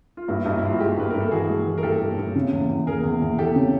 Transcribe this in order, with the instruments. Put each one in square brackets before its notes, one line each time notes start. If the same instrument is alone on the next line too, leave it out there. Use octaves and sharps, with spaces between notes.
[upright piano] F4
[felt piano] G2 [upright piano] E4 F#4
[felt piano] G2 [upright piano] D#4
[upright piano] E4
[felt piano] G2 [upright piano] F4
[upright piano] F#4
[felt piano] G#3 [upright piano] F4 G4
[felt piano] G2 [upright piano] B4
[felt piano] G2 [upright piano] A#4
[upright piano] A4
[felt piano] E3 [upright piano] F#4 G#4
[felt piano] G#3
E3
[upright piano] A#4
[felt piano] G2 [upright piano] G4 A4
[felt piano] G2
G2
C#3
E2
E2
[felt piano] E2 [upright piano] G#4 A#4
[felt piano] E2
E2
[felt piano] E2 [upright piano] G4 A4
[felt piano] C#3